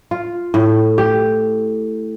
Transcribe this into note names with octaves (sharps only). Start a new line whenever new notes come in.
F4
A2
G4